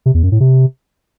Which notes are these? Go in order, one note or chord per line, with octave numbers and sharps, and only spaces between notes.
C3
E2
F#2
A2
C3